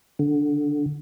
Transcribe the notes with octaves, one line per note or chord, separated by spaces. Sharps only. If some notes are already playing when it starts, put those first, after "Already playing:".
D3